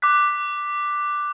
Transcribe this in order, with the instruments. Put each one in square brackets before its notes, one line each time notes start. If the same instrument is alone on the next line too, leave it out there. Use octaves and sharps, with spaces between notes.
[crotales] D6 F#6 B6